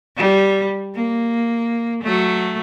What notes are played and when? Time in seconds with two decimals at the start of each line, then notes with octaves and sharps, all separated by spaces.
0.17 G3
0.95 A#3
2.03 F#3 A3